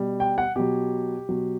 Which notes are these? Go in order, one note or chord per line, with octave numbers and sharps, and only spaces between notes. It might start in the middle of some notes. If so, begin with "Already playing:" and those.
Already playing: B2 G3
G5
F#5
B2 F#3 G4
B2 F#3